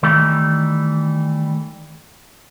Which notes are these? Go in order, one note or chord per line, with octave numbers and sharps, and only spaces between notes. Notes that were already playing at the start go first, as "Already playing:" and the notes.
D#3 E3 G3 A3